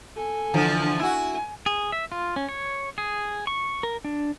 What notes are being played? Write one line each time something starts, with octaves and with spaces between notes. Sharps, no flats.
A4 G#5
D3 E3 F3
E4 F#4 G#5
G#4
E5
F4
C#4
C#5
G#4
C#6
A#4
D4